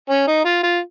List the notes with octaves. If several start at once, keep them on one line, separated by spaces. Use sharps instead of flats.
C#4
D#4
F4
F4